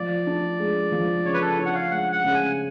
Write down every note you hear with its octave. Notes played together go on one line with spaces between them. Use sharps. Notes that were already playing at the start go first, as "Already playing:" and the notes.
Already playing: F3 D5
D4
G#3
F3
C#3 C#5
B4
A4
D4 C#5
F#5
F5
G#3 F#5
F#5
C#3
G#5